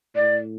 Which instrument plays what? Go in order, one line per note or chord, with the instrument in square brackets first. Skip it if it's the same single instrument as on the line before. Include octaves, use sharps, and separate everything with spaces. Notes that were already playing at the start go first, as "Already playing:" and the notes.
[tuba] A2 [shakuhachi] D5